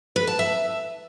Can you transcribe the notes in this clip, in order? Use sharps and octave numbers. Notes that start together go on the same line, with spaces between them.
B4
A5
E5